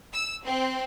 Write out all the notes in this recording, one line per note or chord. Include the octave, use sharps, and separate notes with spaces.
E6
C4